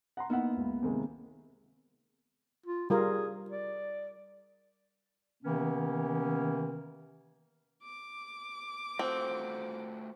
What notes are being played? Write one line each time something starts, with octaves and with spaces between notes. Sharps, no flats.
F#5 A#5 C6
A#3 B3 D#4 E4 F#5
C#2
C3 D#3 G#3
F4
G3 F4 G#4 A#4
D5
C3 D#3 E3 A#3 B3 C#4
D6
A3 C4 F4 F#4 C5